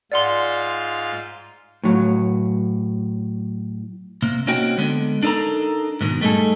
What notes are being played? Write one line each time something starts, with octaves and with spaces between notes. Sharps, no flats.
G#2 F4 D5 F#5 C6
A2 F#3
C3 A#3
A#3 C4 C#4 D#4 F#4 G5
D3 G#3 B3
D4 D#4 A4 A#4 A#5
G#2 B2 D#3
G3 A3 D#4 G#4 A4